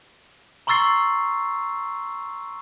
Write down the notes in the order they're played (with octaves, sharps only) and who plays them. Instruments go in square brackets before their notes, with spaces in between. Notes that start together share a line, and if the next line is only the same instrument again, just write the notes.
[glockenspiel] A#5 C6 C#6 E6 A6 C7